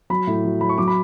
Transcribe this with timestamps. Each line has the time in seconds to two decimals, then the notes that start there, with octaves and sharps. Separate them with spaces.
0.10 F#3 B5
0.27 A2
0.45 F#3
0.61 F#3 B5
0.69 C#6
0.78 F#3 D6
0.88 B5